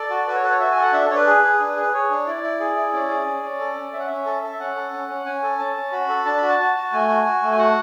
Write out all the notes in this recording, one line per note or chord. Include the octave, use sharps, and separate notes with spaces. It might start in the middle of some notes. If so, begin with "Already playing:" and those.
Already playing: A4 D5
F#4
F#4 B4
C#5
A4 B4
C#5
F#4 E5
G#5
A4
F#5
D4 E5
A4
D4 C#5
B4
G#4
G#4
D4
G#4
B4
G#4 C#5
D4
E4 D5
E4
G#4
E4
C#4 D5
G#4
C#4
C#4
A4
C#4
C#4 E5
F#5
C#4 E5
A4
A4
E5
C#4 F#5
A4
C#4
C#4
C#4 G#5
A4
C#4 A5
C#4
F#4 B5
A4
D4 A5
F#4 B5
A5
F#4
F#4
A3 G#5
F#4
F#4
A3
G#5
F#4 F#5